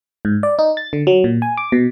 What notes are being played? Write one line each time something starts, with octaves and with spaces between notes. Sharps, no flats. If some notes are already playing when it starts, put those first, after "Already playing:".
G#2
D5
D#4
A6
D3
F#3
A#2
G#5
D6
B2